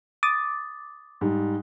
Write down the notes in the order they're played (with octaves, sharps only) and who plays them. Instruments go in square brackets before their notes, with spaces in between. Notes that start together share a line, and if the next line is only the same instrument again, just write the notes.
[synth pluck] D6 D#6 A6
[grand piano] G#2 G3